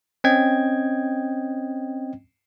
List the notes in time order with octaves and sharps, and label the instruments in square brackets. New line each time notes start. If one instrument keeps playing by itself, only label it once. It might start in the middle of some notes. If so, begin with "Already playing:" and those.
[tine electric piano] C4 C#4 D#5 G5 G#6